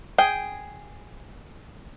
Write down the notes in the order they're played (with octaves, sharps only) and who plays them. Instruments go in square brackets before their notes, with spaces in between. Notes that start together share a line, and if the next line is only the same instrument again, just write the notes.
[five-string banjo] G#4 G5